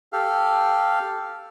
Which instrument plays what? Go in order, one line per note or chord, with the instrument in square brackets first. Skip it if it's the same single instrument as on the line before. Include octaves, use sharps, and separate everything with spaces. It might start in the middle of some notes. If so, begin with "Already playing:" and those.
[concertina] G4 A4 F5